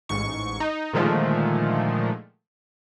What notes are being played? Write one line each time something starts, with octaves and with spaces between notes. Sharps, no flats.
A1 G#2 C#6
D#4
A#2 D3 D#3 F3 G#3 A3